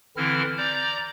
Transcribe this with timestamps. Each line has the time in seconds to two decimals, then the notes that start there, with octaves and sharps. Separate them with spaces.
0.17 D3 E3 C4 E4 F6
0.57 D5 A#5 D6 G6